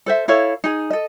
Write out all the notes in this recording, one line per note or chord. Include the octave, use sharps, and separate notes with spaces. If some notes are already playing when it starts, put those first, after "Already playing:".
A4 C5 E5
E4 A4 C#5 F5
D#4 G#4
A4 D#5